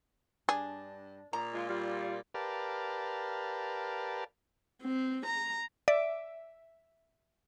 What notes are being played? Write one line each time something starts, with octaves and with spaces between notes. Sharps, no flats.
G2 D4 G#4
A#2 A#5
G#3 F4
G3 F4
G4 A#4 B4 D5 F5 A5
C4
A#5
D5 E5